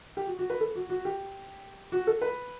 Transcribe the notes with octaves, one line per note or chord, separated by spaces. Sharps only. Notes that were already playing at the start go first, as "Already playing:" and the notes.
G4
F#4
F#4
B4
A4
F#4
F#4
G4
F#4
A4
B4